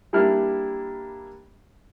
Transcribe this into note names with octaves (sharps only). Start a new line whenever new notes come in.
G3 A#3 D4 E4 F6